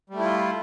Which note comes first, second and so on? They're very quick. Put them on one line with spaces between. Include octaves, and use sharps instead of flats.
G3 A3 E4 F4